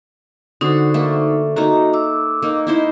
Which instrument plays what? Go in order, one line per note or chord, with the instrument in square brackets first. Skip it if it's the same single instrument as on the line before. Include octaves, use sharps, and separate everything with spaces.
[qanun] D3 F#4 [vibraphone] D#4 C5
[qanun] A3 A#3
[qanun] A3 A#3 D#4 [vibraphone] F#4 A#5
[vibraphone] D6 E6
[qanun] A#3 D#4
D#4 E4 C5